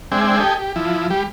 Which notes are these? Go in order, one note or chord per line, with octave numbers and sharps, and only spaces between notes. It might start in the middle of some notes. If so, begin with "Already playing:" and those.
G#3 C4 D4 E5 G5 G#5
G4 A4 D#5 G5 G#5
G4
F3 E4
G3 G4